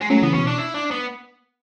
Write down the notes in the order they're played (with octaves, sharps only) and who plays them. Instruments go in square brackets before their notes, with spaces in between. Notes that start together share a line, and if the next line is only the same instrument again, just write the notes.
[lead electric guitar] G#3
[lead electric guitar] F#3 [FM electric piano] A3 C#4
[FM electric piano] C#3 E3 [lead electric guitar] B3
[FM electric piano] B2 [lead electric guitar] C#4
[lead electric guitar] D4
E4
D4
B3